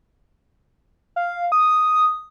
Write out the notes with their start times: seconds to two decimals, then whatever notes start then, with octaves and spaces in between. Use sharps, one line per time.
1.16 F5
1.52 D#6